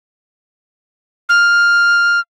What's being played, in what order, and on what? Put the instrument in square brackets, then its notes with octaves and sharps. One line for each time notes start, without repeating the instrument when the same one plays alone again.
[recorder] F6